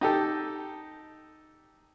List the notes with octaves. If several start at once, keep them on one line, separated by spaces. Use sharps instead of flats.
D#4 G4 A4